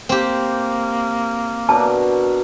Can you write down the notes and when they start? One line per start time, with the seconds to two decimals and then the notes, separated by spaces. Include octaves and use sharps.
0.09 A#3 C4 G4
1.69 B2 D4 A#4 A5